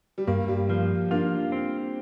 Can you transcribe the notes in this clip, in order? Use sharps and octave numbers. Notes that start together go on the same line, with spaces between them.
G3
G2 A#3
G3
F3 A#3
A#3 D4 F4
C4